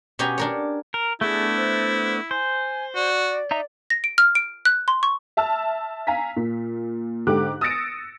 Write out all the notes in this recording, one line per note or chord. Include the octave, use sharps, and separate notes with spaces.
B2 C#4 G4 G#5 A#5
D4 A#4 C#5
A#4
A3 B3 D4 E4 G#4
C5
C5 G#5
F#4 D5
D#4 E5 A#5
A#6
D7
F6
D7
F#6
C6
C#6
E5 A5 E6 F6
F5 G#5 A#5 B6
A#2
G#2 D3 G4 D6 F#6
D#6 E6 A6 A#6 C#7 D7